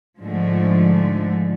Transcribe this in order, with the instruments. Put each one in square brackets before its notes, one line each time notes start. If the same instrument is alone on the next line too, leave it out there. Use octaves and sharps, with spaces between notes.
[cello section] G#2 D3 F3 G#3 A3